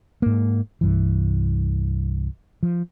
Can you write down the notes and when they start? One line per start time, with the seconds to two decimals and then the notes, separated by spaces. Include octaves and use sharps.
0.22 G#2 A#3
0.81 C2 G2 E3
2.63 F3